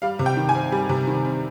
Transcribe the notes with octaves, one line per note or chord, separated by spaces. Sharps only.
G3 F5
C3
G5
D#3
G#5
C4
G3
C3
D#3
C4